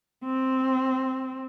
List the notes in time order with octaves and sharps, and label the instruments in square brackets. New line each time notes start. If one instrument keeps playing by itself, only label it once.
[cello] C4